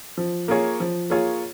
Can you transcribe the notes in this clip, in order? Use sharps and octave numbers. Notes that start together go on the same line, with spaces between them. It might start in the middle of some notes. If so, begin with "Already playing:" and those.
F3
A#3 F4 G#4 C#5
F3
A#3 F4 G#4 C#5